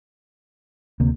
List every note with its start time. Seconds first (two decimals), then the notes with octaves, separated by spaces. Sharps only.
1.00 D2 C3 A#3